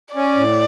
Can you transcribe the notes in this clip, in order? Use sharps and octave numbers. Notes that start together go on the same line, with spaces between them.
C#4 D5
A2